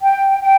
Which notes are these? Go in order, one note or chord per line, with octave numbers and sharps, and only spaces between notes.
G5
G5